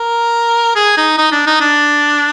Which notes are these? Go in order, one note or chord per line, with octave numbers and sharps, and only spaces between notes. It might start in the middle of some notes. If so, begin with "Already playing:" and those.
Already playing: A#4
G#4
D#4
D#4
D4
D#4
D4